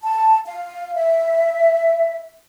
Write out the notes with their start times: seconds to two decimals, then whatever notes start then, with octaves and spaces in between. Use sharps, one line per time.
0.02 A5
0.46 F5
0.95 E5